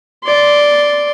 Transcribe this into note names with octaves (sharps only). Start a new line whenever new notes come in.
D5 C6